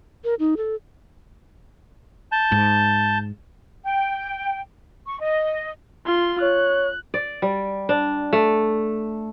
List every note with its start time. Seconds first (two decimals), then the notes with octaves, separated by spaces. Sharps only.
0.24 A#4
0.40 D#4
0.57 A4
2.32 A5 G6
2.52 G#2
3.84 G5
5.06 C#6
5.20 D#5
6.06 F4 C6
6.42 C#5 F#6
7.14 D5
7.42 G3
7.89 D4
8.33 A3